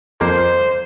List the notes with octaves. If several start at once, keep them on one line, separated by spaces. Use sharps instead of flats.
F2 A#3 C5